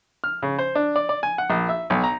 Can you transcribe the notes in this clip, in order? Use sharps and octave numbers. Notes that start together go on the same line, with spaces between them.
F6
C#3
C5
D4
D5
D5
G#5
F#5
A#1
E5
B1
A#5